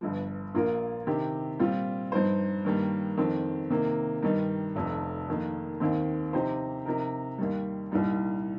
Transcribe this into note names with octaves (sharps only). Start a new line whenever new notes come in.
G1 G2 F3
A#1 A#2 A#3 F4 A#4
C3 D#3 C4 G4
A#2 G3 C4 F4
G2 F3 D#4 C5
G2 D#3 G3 A#3
F2 D#3 C4
C3 D#3 A#3
G2 D#3 G3 D#4
F1 F2 C3
F2 D#3 A#3
D#2 D#3 C4
C3 F3 D#4 G4 C5
C3 F3 D#4 A#4
D#2 D#3 G3
C2 A#2 G3 D#4